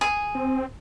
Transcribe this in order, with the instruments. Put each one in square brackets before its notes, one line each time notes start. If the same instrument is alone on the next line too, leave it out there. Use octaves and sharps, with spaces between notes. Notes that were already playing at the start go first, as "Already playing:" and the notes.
[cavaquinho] G#4
[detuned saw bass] C4